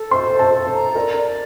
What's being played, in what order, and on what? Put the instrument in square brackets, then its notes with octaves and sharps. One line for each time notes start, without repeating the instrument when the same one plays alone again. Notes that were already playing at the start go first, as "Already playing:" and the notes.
Already playing: [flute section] A4
[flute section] C5 [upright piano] C6
[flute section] A4
[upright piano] A5
[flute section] A4
[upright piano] C5
[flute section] A#5
[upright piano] A#4 [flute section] D5
[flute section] D5